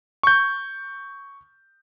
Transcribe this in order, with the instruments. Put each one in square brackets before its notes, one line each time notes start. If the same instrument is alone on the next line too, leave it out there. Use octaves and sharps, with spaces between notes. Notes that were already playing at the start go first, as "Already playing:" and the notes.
[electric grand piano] C#6 G6